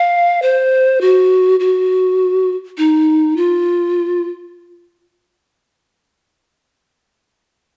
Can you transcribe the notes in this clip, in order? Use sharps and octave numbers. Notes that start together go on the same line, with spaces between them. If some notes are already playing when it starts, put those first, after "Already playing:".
Already playing: F5
C5
F#4
F#4
D#4
F4